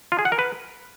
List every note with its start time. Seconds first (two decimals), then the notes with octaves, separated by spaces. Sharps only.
0.12 F4
0.19 G#4
0.25 F#5
0.32 A#4
0.39 B4